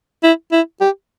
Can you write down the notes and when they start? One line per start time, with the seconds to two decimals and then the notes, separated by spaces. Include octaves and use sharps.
0.24 E4
0.52 E4
0.81 G4